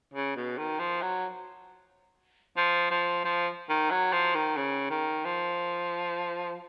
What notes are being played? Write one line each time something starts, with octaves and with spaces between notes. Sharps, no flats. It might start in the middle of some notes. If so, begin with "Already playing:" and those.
C#3
B2
D#3
F3
F#3
F3
F3
F3
D#3
F#3
F3
D#3
C#3
D#3
F3